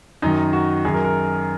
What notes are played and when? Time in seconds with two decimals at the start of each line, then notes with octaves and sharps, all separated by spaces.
0.22 F#2 D#3 D#4
0.53 F#4
0.84 F#2 D#3 G#4
0.94 A#4
1.05 A#4